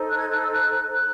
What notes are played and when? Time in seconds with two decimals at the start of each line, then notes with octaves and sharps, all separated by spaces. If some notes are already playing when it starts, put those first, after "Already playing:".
Already playing: D#4 A4 C5
0.09 F#6
0.20 G#6
0.30 F#6
0.42 E6
0.52 F#6
0.93 F#6